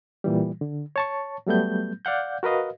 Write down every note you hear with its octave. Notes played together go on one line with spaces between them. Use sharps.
A#2 E3 G3
D3
C#5 A5 C#6
F#3 G3 A3 B3 G6
D5 F5 F#5 G6
F#4 A#4 B4 D#5 F5